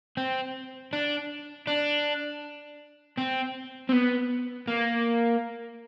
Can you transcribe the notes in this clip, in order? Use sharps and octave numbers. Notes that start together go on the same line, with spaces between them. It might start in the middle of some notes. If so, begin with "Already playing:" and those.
C4
D4
D4
C4
C4
B3
A#3